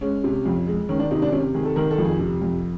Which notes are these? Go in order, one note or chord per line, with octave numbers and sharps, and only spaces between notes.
G#3 C#4
C3
F2
G#3
D#3 C#4
D4
C3 D#4
D4
C3 C#4
D#3 G#4
A4
D#3 A#4
A4
F2
G#4
C3
F2